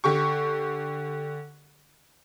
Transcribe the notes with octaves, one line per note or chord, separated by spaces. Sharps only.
D3 G4 C#6